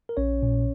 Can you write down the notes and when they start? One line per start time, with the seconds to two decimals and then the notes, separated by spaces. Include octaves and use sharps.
0.09 A#4
0.17 A#1 C#4 C#5
0.43 A#2